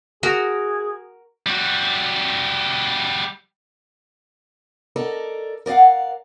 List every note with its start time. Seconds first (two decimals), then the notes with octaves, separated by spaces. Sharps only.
0.23 F#4 G#4 A#4
1.46 G3 F#4
4.96 A4 A#4 D5 D#5
5.66 A#4 D5 D#5 F5 F#5